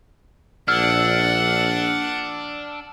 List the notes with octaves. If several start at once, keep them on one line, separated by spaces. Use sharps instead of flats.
A#1 D4 F#5 E6 F6